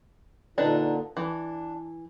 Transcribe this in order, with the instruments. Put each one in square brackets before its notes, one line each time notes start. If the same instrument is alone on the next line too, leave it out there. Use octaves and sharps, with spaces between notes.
[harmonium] A#2 D3 [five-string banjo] D4 D#4 B4
[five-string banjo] E3 [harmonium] D4